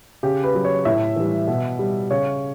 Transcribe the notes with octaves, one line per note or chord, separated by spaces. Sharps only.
C#3 G4
B4
F#3
C#5
A2 E5
E3 G3
B2
G3
C#3 C#5